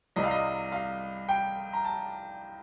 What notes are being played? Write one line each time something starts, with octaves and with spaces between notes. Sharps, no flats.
C2 C3 G3 D#5
F5
D#5
F5
G5
A#5
A5